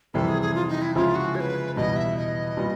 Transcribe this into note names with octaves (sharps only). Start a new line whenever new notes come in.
F2 C3 E3 G3 A4
G#4
G#4
F4
D#4
E4
C#3 F3 G#3 C#4 E4 F4
F#4
C#5
B4
E2 B2 G3 D#5
E5
D#5
A#2 G3 B3